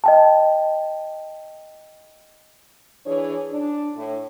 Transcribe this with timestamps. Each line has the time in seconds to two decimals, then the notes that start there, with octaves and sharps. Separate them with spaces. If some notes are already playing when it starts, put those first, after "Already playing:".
0.04 D#5 G5 A5
3.06 E3 D4 G#4 C#5
3.51 D4
3.96 A2